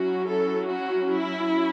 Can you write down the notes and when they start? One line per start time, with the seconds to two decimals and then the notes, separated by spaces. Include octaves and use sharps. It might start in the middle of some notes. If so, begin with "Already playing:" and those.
Already playing: F#3 C#4 E4 F#4
0.28 A4
0.68 F#4
1.09 E4